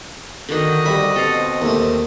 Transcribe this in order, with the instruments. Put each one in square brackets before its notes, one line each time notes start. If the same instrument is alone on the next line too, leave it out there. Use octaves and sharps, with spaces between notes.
[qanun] D3 D#3 [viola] F#4 D#5
[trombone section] F2 G3 [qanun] E5 [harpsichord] B5
[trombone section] B2 C4 [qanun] A4 F5
[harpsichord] D#2 A3